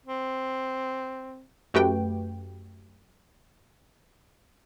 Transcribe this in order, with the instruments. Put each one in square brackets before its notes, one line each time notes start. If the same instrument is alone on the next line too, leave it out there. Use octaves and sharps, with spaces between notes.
[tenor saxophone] C4
[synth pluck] F#2 A3 F#4 G4 B4 G5